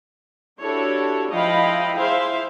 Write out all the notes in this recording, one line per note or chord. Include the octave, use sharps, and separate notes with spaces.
D4 E4 F#4 G4 A4 C#5
F3 E4 D#5 F5 G5 B5
E4 G#4 C5 E5 F5